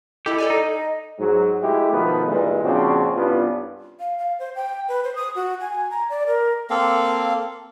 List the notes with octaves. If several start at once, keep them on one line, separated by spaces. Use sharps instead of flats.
E4 G4 A4 D#5
A4 D5 G#5
D#4
D#5
G#2 F#3
G#3 A3 E4 F#4 G4
B2 D#3 F3 A3 B3 B4
G2 A#2 E3 G#3
A#2 C#3 F3 C4 D4 F#4
C2 G2 B3 C#4 F4
F5
F5
C5
G5
B4
C5
D#6
F#4
G#5
A#5
D5
A#4
A#3 C4 A4 F5